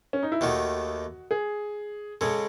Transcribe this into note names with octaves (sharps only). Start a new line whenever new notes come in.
C#4
D#4
E4
D#2 D#3 A3 F#4
G#4
C#3 G#3 A4